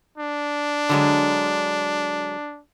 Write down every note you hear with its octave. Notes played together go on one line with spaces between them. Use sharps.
D4
D3 F#3 G#3